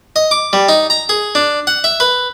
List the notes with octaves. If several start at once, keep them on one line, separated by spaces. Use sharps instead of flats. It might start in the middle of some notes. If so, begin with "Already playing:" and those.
D#5
D6
G3
D#4
A#5
G#4
D4
F#5
E5
B4